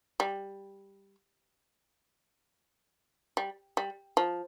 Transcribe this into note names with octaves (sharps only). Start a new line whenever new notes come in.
G3
G3
G3
F3